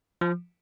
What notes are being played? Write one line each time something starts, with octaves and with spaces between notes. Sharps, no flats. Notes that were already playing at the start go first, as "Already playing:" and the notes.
F3